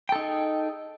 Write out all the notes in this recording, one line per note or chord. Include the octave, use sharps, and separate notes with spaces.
D#4 G#4 A4 G5